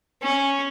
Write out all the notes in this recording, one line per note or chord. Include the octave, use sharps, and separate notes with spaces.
C#4